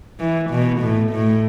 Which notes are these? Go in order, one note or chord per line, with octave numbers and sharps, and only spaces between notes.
E3
B2
A2
A2